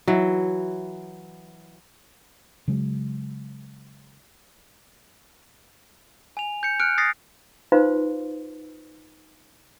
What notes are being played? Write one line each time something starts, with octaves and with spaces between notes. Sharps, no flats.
E3 F#3
C#3 F#3 G#3
G#5 F7
G6 C#7
F6 F#6 C#7 D7
D#6 A6 A#6 C7
D#4 F4 B4 C5 F5 C6